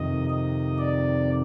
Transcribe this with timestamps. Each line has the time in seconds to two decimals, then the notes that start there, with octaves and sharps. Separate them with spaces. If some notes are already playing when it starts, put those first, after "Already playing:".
Already playing: F2 C3 D#3 D#5
0.30 D#5
0.79 D5